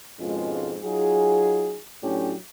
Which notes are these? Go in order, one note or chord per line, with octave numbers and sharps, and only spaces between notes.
F2 G#2 B2 G#3 C#4 F4
F#3 D#4 F4 G#4
A2 F#3 C#4 D4 E4 G4